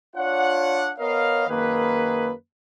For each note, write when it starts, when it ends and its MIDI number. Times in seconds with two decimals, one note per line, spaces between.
0.16 0.91 62
0.16 0.91 65
0.16 0.91 73
0.16 0.91 74
0.16 0.91 78
0.99 1.47 59
0.99 1.47 70
0.99 1.47 73
0.99 1.47 75
0.99 1.47 77
1.49 2.32 42
1.49 2.32 51
1.49 2.32 58
1.49 2.32 68
1.49 2.32 71